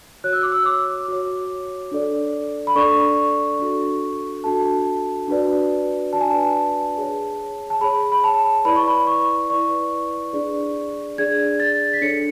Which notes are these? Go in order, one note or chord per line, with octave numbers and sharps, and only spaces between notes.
F#4 C#5 F#6
E6
D6
E6
D6
F#4 C#5
D4 A4 D5
B5
D4 A4 D5 C#6
D4 F#4 A4
D4 F#4 A4 A5
D4 F#4 B4 D5
D4 F#4 B4 D5 A5
G#5
A5
G#4 C#5
A5
G#4 C#5 B5
B5
A5
E4 B4 D5 B5
C#6
B5
C#6
E4 B4 D5 C#6
D4 G#4 D5
D4 G#4 D5 G#6
A6
B6
D4 A4 C#5 C#7